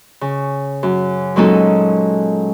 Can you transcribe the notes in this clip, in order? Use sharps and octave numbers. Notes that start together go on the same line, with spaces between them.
C#3
F#2
A#2 F#3 G#3 C#4 D#4 A4